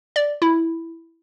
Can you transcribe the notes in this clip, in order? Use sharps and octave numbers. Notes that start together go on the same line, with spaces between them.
D5
E4